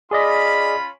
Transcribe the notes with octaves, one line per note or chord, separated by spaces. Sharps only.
C#4 F4 G#4 D5 D#5 B5